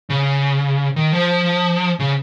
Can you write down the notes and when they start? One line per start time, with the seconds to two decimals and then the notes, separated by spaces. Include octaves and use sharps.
0.10 C#3
0.96 D#3
1.13 F3
2.00 C#3